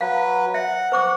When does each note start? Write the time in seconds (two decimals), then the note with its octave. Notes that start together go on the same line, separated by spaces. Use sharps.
0.01 F#3 B4 F5
0.54 E5 F#5
0.92 C5 C#6 D6